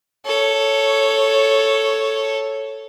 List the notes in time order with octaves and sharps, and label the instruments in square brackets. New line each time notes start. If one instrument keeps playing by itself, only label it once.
[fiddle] A4 C#5